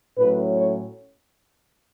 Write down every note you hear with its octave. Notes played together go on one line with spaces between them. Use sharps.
A2 F#3 C#4 B4
C#5